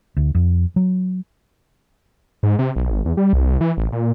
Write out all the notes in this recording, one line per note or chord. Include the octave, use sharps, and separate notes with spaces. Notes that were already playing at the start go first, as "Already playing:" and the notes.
D2
F2
F#3
G#2
C3
B1
G#1
E2
G3
C2
C2
E3
A1
A#2